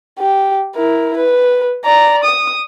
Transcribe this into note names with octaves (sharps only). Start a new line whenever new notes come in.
G4
E4 A#4
B4
D5 A#5
D#6